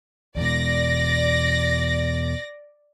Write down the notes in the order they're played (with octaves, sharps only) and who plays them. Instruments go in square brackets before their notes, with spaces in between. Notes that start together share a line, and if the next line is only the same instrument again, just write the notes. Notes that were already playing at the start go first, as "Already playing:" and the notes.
[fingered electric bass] E2 B2 [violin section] D5 A#6